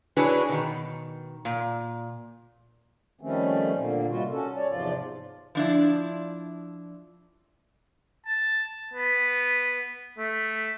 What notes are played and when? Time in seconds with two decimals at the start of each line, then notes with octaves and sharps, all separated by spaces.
0.17 D4 E4 F#4 G#4 B4 C#5
0.49 B2 D#3
1.45 A#2
3.21 D#3 F3 G3 A3 C4 C#4
3.75 A#2 D3 A#3
4.09 C3 D#3 G3 F4 F#4
4.31 C#4 F#4 A4
4.56 C#5 D5
4.69 E2 G#2 C3 F3 F4 D5
5.55 F3 D4 E4
8.26 A5
8.93 B3
10.18 A3